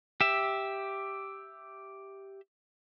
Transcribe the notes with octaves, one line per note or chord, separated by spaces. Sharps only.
G4 E5